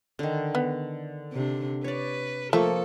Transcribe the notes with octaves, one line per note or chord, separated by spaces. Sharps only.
D3 D#3
B3
C3 D4
B4 C#5 D5
F3 A3 A#3 A4 C#6